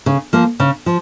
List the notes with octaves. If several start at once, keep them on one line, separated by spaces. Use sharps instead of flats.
C#3
F3 A#3
C#3
F3